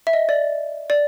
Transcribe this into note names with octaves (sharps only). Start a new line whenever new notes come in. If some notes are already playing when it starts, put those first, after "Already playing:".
E5
D#5
D5
D5